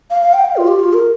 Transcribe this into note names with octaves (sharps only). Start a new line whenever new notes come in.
F5
F5
G5
F5
F4
G4
F4
A#4